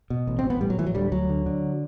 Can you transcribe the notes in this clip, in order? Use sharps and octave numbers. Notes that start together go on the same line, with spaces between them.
B2
A1
C4
A1
B3
A2 G3
F#3
A2 E3
F#3
D2 G3
D2 F#3
D3
D3